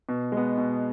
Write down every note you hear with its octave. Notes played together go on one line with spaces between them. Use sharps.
B2
G#3 B3
B2